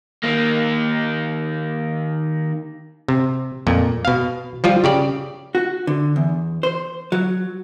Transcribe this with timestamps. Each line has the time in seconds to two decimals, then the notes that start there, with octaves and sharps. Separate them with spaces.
0.24 D#3 A#3
3.08 C3
3.67 F2 A#2
4.05 B2 F5
4.64 F3 G3 F4
4.84 C#3 G4 D5
5.55 F#4
5.87 D3
6.16 E2
6.63 C5
7.12 F#3